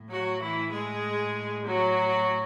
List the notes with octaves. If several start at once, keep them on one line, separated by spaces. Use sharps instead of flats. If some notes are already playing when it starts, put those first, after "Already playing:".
Already playing: A2
F#3 F#4
E3 E4
G#3 G#4
F#3 F#4